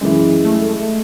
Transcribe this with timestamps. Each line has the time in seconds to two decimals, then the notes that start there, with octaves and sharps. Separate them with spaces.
0.01 F#2 C#3 E3 G#3
0.45 A3